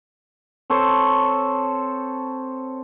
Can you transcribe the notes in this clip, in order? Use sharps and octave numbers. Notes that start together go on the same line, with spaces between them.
C4 A4 C5 C#5